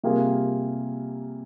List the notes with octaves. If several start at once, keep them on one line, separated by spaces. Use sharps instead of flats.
C3 G3 A#3 F4 G#4